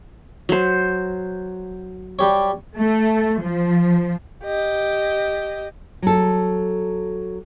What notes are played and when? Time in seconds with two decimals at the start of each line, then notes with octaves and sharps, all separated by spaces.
0.49 F#3 C5
2.19 G3 G4 C#5
2.79 A3
3.41 F3
4.44 G4 D#5
6.02 F#3 A4